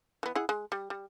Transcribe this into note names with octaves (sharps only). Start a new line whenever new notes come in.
E3 B3
E4 G#4 F#5
G#3
G3
G3